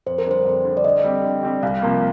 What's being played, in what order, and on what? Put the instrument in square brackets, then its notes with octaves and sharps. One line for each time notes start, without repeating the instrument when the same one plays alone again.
[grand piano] F2 [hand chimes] C5
[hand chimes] A#4
[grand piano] D3 G3 D4 [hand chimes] C5
[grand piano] F2
D3 G3 D4
[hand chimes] D5
[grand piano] D3 [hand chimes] D#5
[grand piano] G3 C4 G4
D3
G3 C4 G4
[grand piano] C2 [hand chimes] F5
[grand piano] C3 F3 A#3